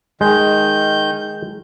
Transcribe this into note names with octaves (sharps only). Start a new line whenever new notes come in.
D#3 G#3 G6